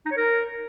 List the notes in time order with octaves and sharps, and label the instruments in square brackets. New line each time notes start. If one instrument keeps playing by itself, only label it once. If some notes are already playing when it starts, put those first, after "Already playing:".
[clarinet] D#4
C#5
A#4